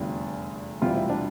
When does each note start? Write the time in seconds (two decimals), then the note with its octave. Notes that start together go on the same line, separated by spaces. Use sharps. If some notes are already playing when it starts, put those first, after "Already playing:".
Already playing: F1 E2 D3 G3 F4
0.82 E1 D2 C3 E3 G3 F4
0.95 E4
1.09 D4